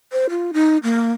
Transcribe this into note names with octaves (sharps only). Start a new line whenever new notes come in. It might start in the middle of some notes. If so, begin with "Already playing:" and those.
C5
F4
D#4
A#3